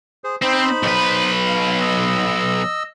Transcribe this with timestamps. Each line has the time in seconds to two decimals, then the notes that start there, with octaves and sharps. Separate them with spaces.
0.24 G#4 C5
0.42 C4 D#4 C5 B5
0.83 B1 B4
1.47 F5
1.81 D#5 E6